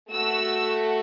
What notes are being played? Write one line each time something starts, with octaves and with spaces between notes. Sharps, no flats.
A3 F#4 A4 E6